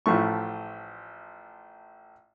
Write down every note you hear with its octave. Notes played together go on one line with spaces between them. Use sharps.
A1 F3 A3 C#6